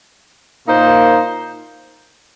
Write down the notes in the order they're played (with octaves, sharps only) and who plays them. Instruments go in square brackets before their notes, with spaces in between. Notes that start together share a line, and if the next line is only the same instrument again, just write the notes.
[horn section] A#2 A#3 D#4 C5